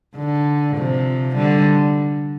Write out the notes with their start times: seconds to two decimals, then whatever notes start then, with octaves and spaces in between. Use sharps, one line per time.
0.17 D3
0.76 C3 F3
1.35 D3 G3